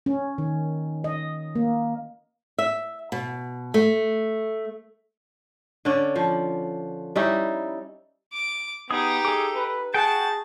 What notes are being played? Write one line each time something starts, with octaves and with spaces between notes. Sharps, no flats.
C#4
D#3
D#5
A#3
E5
B2
A3
D3 C#4 D5
F3
G3 C#4 D#4 E4
D6
B3 D#4 G4 G#4 D#6
G#4 A4 D6
B4
F#4 G#4 F#5 G5 A5